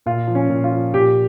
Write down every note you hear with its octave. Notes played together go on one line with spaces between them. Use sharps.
A#2 F4
F3
C#4
A#2
F4
F3
A#2 G4